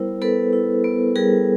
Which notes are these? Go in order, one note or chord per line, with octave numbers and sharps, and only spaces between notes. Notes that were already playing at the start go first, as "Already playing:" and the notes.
Already playing: G3 B3 E4 A#4 C5
B3 A4 B4
E4
B3
G3 G#4 A#4